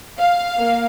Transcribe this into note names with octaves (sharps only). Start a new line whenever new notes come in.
F5
A#3